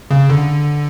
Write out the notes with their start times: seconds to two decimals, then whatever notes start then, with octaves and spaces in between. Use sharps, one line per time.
0.11 C#3
0.30 D3